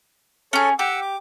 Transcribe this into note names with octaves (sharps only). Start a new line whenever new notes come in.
C#4 G#4 A4 C#5
G4 F#5 D6 E6
D6